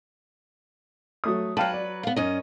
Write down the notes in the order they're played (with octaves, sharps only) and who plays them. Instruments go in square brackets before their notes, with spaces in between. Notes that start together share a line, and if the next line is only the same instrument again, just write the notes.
[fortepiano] F#3 A3 D#6
[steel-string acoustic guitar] F#3 B4 [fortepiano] F5 G5 A5
[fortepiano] D5
[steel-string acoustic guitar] B3 F5
F#2 C#4 D#5